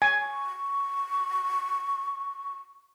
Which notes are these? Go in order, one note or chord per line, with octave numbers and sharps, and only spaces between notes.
G#5 C#6